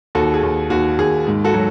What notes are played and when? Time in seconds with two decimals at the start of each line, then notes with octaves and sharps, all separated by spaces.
0.15 D#2 F#4 A4
0.34 G#4
0.43 D#2
0.70 D#2 F#4
0.98 D#2 G#4
1.27 G#2
1.44 F#4 A4
1.54 F#3